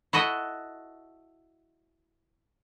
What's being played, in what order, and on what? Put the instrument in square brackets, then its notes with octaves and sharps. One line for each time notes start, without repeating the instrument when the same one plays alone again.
[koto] E4 F#4 A4 D#5